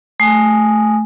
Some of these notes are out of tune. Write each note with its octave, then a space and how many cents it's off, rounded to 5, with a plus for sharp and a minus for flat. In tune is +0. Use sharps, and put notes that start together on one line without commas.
A3 -10 G#5 +0 D#6 -5